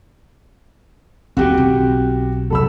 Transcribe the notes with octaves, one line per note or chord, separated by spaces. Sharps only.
F#1 D#2 D3 C4 F#4 G4
B1
F1 F#2 C3 A4 B5 E6